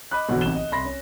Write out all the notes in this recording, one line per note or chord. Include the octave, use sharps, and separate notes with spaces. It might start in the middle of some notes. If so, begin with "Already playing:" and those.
D#5 B5 D6 F#6
B1 B2 D3 E3 F#3
A1 C3 B3 D#4 E7 G7
D#5
C2 B5 C6 A#6
C#4